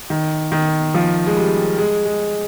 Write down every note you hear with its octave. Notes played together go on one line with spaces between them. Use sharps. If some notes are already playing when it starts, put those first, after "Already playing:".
D#3
D#3
F3
G#3
G3
G#3
G#3